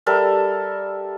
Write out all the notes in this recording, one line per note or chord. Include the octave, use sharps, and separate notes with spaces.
G3 A4 A#4 E5